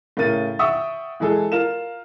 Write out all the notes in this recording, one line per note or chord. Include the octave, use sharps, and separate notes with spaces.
A2 C#3 A#4 A6 D#7
E5 F#5 G5 C#6 D#6 E6
E3 G#3 G#4 A4
F4 A#4 F5 E7